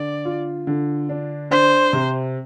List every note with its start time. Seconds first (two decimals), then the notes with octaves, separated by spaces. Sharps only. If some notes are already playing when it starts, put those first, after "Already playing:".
Already playing: D3 D5
0.25 F4
0.67 D3
1.09 D4
1.51 D4 C5
1.93 C3